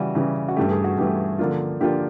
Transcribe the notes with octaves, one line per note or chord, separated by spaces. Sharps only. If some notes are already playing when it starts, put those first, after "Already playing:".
Already playing: C#3 E3 G3 F#4
C#3 E3 G3
F#4
G2 E3 A3 G4
G#4
F#4
G2 E3 A3 G4
D3 F3 A#3 D4 F4
D3 F3 A#3 D4 F4 G4